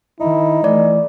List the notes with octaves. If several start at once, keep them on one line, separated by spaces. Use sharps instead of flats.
D#3 D#4 E4
E3 A3 D5